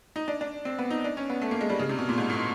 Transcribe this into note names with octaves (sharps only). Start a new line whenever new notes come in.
D#4
D4
D4
C4
B3
D#4
D4
C#4
B3
A3
A#3
G#3
G3
C#3
C3
B2
A#2
G#2
A2